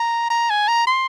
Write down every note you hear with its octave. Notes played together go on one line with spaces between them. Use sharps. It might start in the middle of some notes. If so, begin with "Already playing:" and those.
Already playing: A#5
A#5
G#5
A#5
C6